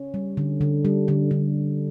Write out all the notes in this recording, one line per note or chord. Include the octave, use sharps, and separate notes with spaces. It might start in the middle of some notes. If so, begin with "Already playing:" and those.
Already playing: C#4
G3
D3
D3
G3
D3
D3